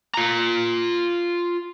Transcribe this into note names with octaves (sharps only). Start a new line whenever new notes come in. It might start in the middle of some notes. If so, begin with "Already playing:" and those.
F4 A#5